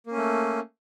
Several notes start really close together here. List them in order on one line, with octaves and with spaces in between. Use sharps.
A#3 C#4 A3